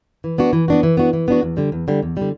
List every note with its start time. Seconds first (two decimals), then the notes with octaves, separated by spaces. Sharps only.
0.24 E3
0.38 B3 D4 F#4
0.53 E3
0.68 B3 D4 F#4
0.83 E3
0.97 B3 D4 F#4
1.13 E3
1.28 B3 D4 F#4
1.43 E2
1.57 D3 G3
1.72 E2
1.88 D3 G3
2.02 E2
2.17 D3 G3